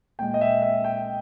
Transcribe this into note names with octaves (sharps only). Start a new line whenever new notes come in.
A#2 G#3 G5
D#5
E5
E5
G5